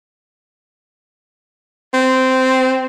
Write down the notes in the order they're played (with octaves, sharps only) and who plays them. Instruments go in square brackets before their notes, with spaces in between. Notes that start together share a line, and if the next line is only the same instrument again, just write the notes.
[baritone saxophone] C4